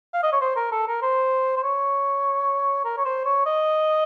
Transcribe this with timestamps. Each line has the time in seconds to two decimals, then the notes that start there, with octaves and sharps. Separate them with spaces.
0.14 F5
0.23 D#5
0.32 C#5
0.41 C5
0.56 A#4
0.72 A4
0.88 A#4
1.02 C5
1.57 C5
1.63 C#5
2.85 A#4
2.98 C#5
3.05 C5
3.25 C#5
3.46 D#5